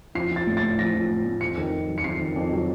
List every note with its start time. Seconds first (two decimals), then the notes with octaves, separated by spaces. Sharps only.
0.15 F3 C7
0.31 F3 A6
0.47 A2
0.57 A6
0.63 A2
0.78 F3 A#6
0.94 F3
1.10 A2
1.26 A2
1.41 F2 C#7
1.58 D#3
1.72 F2
1.88 F#3
1.98 C#7
2.04 F2 C7
2.20 D#3
2.36 F2
2.52 F#3